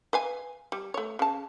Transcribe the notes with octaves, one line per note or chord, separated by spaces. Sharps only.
B4 F5 G#5
G3
A3 C#5
C#3 A5